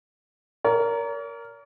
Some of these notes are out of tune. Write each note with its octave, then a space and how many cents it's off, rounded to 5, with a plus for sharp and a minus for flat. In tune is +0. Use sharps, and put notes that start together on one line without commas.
A#4 +0 C#5 +45